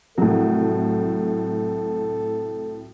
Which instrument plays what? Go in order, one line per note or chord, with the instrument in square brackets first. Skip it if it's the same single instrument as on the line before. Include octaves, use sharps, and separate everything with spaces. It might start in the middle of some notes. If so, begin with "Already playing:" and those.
[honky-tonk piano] C2 A2 [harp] F#3 [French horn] A4